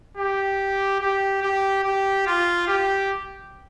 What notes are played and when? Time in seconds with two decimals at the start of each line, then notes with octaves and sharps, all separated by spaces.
0.17 G4
1.00 G4
1.42 G4
1.84 G4
2.26 F4
2.67 G4